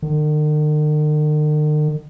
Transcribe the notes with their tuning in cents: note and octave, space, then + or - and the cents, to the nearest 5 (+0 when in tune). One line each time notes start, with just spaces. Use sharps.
D#3 -45